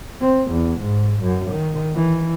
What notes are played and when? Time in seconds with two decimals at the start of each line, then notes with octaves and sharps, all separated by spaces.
0.22 C4
0.52 E2
0.82 G#2
1.22 F#2
1.52 D#3
1.96 E3